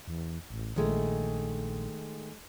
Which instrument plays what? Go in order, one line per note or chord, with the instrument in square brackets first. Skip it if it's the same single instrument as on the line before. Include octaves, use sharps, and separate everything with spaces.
[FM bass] E2
A1
[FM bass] A#1 [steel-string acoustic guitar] D#3 G#3 A3